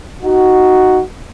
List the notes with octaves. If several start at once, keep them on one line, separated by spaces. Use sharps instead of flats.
D#4 F#4